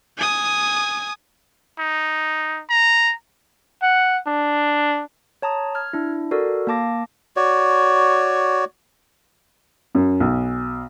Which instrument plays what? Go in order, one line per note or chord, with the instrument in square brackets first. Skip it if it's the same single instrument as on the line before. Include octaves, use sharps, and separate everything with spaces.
[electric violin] G#5 D#6
[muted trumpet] D#4
A#5
[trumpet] F#5
D4
[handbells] C#5 A5 A#5 D#6
F6 G#6
D4 E4
F#4 A4 A#4 D5
A#3 F5 A5 D6 A#6
[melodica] F#4 C#5 D5
[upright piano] F#2
B1